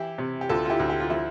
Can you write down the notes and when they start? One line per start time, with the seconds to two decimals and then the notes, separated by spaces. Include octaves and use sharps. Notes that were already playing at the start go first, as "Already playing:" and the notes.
Already playing: E3 E4 G4
0.18 C3
0.41 G4
0.49 D2 F4 A4
0.65 F4
0.70 E4 G4
0.79 D2
0.90 G4
1.00 F4
1.10 F3 E4